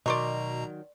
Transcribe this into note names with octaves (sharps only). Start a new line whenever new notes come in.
B2 D#3 F#3 D5 D#5 A#5 C6 C#6